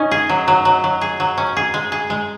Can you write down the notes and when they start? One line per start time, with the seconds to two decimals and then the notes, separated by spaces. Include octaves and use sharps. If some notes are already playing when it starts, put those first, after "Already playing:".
Already playing: C#4 D#4
0.11 G#4
0.29 F#3
0.48 F#3
0.65 F#3
0.84 F#3
1.01 G#4
1.20 F#3
1.38 C#4
1.57 G#4
1.74 G#3
1.92 G#4
2.10 G#3